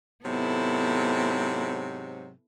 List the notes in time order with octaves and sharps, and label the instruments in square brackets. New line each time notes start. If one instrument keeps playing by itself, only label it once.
[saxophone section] G#2 C3 F#3 [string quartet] B3 E4 A4